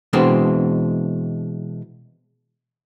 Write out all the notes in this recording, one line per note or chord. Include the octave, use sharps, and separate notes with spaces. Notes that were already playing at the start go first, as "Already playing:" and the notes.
B2 E3 G#3 C4 D4